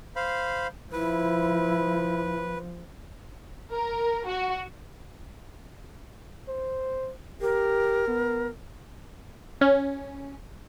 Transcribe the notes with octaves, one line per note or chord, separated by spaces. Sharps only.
C5 F5 B5
F3 E4 B4
A#4
F#4
C5
G4 A#4
B3
C#4